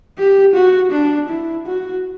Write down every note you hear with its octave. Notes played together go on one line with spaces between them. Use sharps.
G4
F#4
D4
E4
F#4